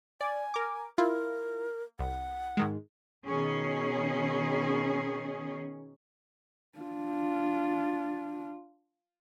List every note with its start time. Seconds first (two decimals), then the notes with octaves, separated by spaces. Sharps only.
0.21 D5 G#5
0.54 A#4 D6
0.98 E4 F4 A#4
1.99 C2 F#5
2.57 G#2 D#3 G#3
3.25 B2 D#3 C#4 G#4
6.79 D4 F4